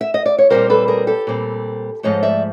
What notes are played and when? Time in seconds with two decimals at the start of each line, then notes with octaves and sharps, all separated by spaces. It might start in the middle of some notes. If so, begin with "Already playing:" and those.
0.01 E5
0.14 D#5
0.26 D5
0.38 C#5
0.50 A#2 G3 C4 A#4 C5
0.70 A4 B4
0.88 G#4 A#4
1.07 G4 A4
1.27 A#2 G3 C4
2.03 G#2 F3 A3 C#5 D#5
2.23 D5 E5